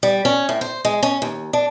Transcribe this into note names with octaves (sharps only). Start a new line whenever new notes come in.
G3
C#4
A2
C5
G#3
C#4
D#2
D4